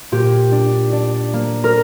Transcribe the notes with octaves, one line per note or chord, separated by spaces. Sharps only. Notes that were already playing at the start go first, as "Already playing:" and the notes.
A#2 G4
D4
D4
A#3
A#4